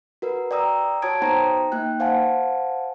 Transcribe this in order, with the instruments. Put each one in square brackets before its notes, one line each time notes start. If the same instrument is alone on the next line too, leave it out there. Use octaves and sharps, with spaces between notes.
[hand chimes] F#4 A#4 B4
D5 G5 A#5 D#6 E6
F#4 C#5 A5 D#6 G#6 D7
B3 D#4 C5 G5 A#5
A#3 D#4 G5 F#6
C5 F5 F#5 G#5 A5